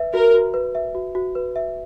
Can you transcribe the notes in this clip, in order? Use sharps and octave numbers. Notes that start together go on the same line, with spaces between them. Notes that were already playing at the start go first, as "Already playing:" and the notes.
Already playing: B4 E5
F#4 A#4
F#4
B4
E5
F#4
F#4
B4
E5